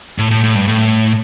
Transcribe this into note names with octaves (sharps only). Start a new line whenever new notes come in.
A2
A2
A2
G2
A2